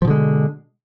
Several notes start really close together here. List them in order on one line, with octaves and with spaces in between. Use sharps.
F3 B2 D3 G#3